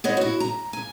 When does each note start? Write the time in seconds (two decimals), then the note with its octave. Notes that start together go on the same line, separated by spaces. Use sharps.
0.04 B3 C4 C#5 D#5 F#5
0.17 E4 F#4
0.40 A#5
0.73 G#5